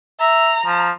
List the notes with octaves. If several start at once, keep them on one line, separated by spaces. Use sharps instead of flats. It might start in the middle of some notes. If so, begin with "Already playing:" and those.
E5 A#5
F3